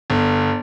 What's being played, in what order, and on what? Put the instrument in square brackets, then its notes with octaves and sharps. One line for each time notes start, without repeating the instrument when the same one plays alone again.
[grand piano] G1